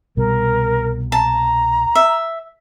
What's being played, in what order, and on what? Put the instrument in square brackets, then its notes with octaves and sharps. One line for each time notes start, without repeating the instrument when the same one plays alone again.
[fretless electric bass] C2 B2 G3 [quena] A#4
[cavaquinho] A5 [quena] A#5
[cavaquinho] E5